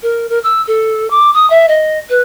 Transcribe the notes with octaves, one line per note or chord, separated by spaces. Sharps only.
A#4
A#4
E6
A4
D6
D#6
E5
D#5
B4